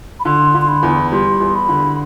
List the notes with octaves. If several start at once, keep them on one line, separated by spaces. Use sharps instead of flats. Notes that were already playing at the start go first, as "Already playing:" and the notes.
B5
D3 C6
D3
C6
B5
E2
G3 C6
E2
B5
D3